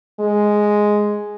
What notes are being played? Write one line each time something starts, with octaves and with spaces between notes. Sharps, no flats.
G#3